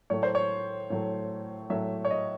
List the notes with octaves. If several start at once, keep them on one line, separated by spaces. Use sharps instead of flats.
A2 F#3 A3 C#5
C5
C#5
A2 F#3 A3
A2 F#3 A3 E5
C#5
D#5